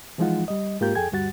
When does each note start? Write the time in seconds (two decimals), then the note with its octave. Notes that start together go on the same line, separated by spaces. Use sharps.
0.18 E3 F3 G#3 D#4 F4 F#5
0.48 G3 D#5
0.81 G#2 A#3 F4 G4 A#4 G6
0.95 F2 G#4 A4 G5 G#5 G#6
1.12 D2 G2 G3 F#4 F#5 A6